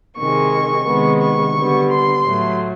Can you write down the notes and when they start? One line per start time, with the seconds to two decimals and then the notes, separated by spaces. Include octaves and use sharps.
0.18 C3 D#3 G#3 C#6
0.86 C3 D#3 G#3 B3
1.21 C#6
1.56 D3 G3 B3
1.90 C6
2.24 A2 F#3 A3